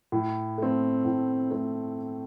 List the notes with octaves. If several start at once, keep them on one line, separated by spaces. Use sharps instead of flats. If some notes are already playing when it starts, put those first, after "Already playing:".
A2
A3 C4
A2
A3 C4